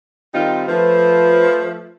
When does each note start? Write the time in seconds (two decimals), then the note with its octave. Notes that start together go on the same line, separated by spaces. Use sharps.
0.34 D#3 G3 C4 D#4 F4
0.69 F3 A3 B4